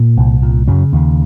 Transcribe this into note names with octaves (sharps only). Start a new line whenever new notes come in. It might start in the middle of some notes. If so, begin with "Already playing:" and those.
Already playing: A#2
C2
A#2
F#2 C#3 F#3
D#2